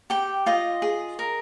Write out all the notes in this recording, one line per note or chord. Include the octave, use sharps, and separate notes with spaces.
G4 G5
F4 D#5
G#4
A#4